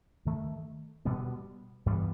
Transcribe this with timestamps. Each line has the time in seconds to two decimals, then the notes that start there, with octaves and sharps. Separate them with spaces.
0.25 G2 D#3 A3
1.05 B2 G3 B3
1.86 G2 E3 G3 B3